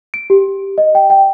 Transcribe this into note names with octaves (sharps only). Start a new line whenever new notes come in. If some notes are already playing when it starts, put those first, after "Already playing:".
D7
G4
D#5
G5
G5